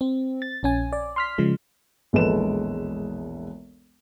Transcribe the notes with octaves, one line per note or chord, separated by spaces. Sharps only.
C4
A6
A#1 C#4 G#5
D5
C6 F6 B6
C#3 F3 G#3
E1 A#1 G#3 A4 B4 E7